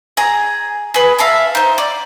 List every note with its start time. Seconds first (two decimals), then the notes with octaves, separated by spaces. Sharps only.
0.17 G#4 A#5
0.94 G#4 B4
1.19 E5 F5 A5 A#5
1.55 D#4 C5
1.78 D5